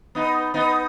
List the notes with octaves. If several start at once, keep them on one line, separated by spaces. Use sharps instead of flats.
B3 D#4
B3 D#4